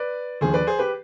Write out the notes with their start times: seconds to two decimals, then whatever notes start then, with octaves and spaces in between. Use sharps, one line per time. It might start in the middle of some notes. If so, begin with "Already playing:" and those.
Already playing: B4 D5
0.41 D#2 D3 F3 G#4 C5
0.54 B4 D5
0.67 G#4 C5
0.79 G4 B4